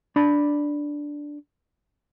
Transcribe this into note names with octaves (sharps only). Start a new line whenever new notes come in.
D4 D5 B5